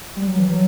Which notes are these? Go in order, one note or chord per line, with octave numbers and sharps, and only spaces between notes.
G3
F#3
E3
F#3